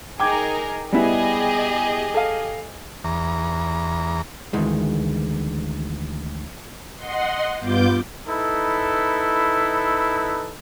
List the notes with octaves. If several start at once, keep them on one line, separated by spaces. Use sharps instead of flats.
D#4 G#4 A#4 G5 D6 G#6
G3 B3 E4 G4 G#4 D#5
A4 F5
E2 A#5
D2 D#3 E3 G#3
D#5 F#5 C6
G2 B3 F4 D6 G6
D#4 E4 A4 B4